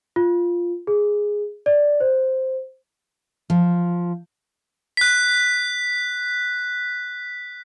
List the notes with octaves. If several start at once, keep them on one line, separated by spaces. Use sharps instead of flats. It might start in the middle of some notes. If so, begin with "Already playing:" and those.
F4
G#4
D5
C5
F3
F#6 B6